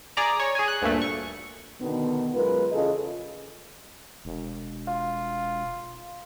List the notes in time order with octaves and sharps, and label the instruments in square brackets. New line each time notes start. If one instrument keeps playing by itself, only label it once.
[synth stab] G#4 D5 A#5
C#5
G#4 G#5
F#6
D2 G2 A#2 A3
C#6
[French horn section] B2 D3 D#3 B3
F#2 G#3 F4 A#4 B4
E2 C#3 F4 G#4 A4 D#5
[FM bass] E1
[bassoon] F4